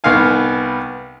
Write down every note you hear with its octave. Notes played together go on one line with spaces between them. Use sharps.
C2 B3 D#4 F5 G#5